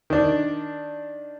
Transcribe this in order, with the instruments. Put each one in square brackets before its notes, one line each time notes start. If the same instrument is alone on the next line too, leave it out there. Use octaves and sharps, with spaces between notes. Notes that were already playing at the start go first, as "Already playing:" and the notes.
[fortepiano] D#3 D4